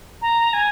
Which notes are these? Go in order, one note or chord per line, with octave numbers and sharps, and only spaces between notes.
A#5
G#5